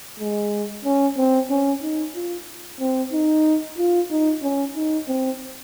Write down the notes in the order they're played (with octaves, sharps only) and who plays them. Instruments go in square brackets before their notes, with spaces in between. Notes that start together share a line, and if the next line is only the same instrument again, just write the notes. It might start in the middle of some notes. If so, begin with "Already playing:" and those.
[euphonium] G#3
C#4
C4
C#4
D#4
F4
C4
D#4
F4
D#4
C#4
D#4
C4